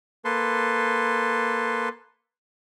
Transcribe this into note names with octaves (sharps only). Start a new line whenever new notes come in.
A#3 A4 B4 C6